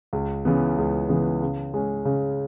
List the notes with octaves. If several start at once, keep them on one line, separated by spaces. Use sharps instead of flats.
C#2
C#3 E3 G#3 B3
C#2
C#3 E3 G#3 B3
C#3
G#3 C#4
C#3